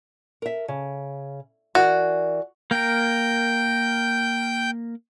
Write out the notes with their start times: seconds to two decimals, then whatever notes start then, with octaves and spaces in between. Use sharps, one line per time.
0.42 A#4 E5
0.68 C#3
1.75 E3 F#4 A#4 D5
2.71 A#3 A#4 G5 G6